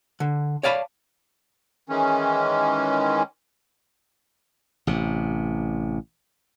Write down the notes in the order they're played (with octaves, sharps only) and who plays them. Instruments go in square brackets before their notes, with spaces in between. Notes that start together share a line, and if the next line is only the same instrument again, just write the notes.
[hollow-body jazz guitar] D3
C#5 D5 F5 A5 B5
[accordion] D#3 E3 G#3 C#4
[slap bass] A1 C3